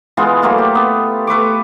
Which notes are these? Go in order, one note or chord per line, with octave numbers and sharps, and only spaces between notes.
E3 G#3 B3 F4
F#3 A3 A#3 F4
G4
B3
A3 B4 C#6 D6